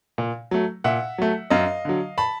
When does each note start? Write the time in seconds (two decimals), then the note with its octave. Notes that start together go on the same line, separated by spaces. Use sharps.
0.18 A#2
0.51 F#3 A3
0.84 A#2 E5 F#5
1.18 F#3 A3
1.50 F#2 D#5 F5
1.85 D3 F#3
2.18 A5 B5